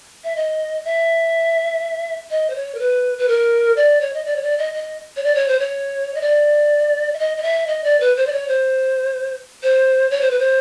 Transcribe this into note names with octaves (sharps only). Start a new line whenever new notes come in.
E5
D#5
E5
D#5
C5
C#5
A#4
B4
B4
A#4
D5
C#5
D#5
D5
C#5
D5
D#5
D#5
C#5
D5
C#5
C5
C#5
D#5
D5
E5
D#5
D#5
E5
D#5
D5
B4
C5
D5
C#5
C5
C5
C#5
C5
B4
C5